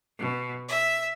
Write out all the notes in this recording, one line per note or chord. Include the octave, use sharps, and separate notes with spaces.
B2
E5